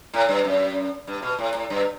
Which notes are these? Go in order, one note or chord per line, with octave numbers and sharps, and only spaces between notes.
A2
G2
F#2
G2
B2
A2
A2
G2